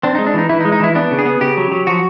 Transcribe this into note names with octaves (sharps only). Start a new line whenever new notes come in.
C4 D4
G#3 D#4
D4
E3 D#4
E3 E4
D#4
G#3
D#4
E3 E4
B3 D4
C#3
G#4
B3
C#3 G4
F#3
F#3
F3 F#4